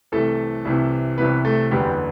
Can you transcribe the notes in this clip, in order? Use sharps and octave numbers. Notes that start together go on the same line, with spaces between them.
C2 C3 E3 A3 A4
C2 C3 E3
C2 C3 E3 B3 B4
A3 A4
F#1 E2 D3 G3 B3 G4